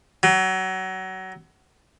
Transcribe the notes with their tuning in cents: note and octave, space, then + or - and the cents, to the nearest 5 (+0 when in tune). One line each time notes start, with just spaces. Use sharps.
F#3 +25